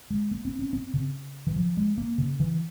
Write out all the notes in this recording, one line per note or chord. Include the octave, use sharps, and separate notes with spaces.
G#3
A#3
C4
C#4
C4
C#3
E3
F3
G#3
A#3
C#3
E3